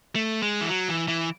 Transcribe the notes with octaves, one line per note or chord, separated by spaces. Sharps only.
A3
G#3
E3
F#3
E3
E3